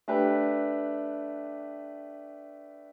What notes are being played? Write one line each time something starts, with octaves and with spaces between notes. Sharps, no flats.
A3 D4 G4 B4